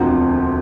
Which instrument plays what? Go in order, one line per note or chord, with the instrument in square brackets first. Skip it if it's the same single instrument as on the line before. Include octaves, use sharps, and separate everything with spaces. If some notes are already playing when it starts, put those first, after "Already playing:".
Already playing: [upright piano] E1 D2 D3 F3 C4